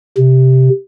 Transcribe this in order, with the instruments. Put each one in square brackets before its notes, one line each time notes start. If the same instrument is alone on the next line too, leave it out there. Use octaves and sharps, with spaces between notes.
[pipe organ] C3